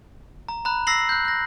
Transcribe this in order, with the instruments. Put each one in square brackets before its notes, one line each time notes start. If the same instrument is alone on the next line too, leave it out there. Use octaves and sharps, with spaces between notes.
[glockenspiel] A#5
A#5 B5 F#6
E6 A#6 C7 F#7
F#6 G6
F#6 A#6